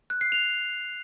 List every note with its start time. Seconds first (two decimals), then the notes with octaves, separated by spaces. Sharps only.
0.10 F#6
0.21 C7
0.32 F7